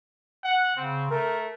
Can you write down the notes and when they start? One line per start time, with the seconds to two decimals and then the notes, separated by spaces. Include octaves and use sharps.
0.44 F#5
0.77 C#3 C4
1.11 A3 A#4